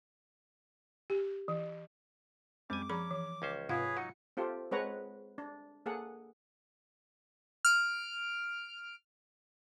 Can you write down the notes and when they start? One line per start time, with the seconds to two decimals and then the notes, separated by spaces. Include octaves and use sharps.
1.10 G4
1.48 E3
2.70 F#2 G3 G#3 C4 G#5 D6
2.90 F3 C#4 G#4 A#5 B5
3.11 E3
3.42 C#2 C#4 C5
3.69 G#2 C3 F4 G#4 B4 C#5 F5 F#5
3.97 F#3 D#4 F#5 C#7
4.37 C4 F4 G4 A4
4.71 G#3 C4 B4 C#5 F#5 A#5
5.38 D4
5.86 A#3 G#4 A4 F#5
7.65 F6 D7